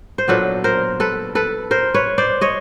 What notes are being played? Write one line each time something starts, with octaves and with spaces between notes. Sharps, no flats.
C5
A#2 F#3 B3 D4 A4 B4
A#4 C5
A4 B4
A4 B4
A#4 C5
B4 C#5
C5 D5
C#5 D#5